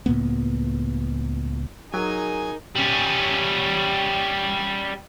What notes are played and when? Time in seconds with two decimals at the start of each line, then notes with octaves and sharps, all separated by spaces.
0.06 C#2 A2 A#3 B3
1.94 F#3 D#4 G#4 A#4 G#5
2.76 G3 C#4